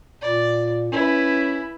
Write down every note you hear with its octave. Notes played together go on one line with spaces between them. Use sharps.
A#2 D5
C#4 E4 B4